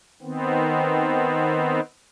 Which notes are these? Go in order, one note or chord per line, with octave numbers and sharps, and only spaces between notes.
D#3 B3 C4